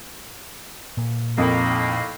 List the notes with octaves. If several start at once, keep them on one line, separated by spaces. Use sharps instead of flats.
A#2
F2 A2 D#3 A#3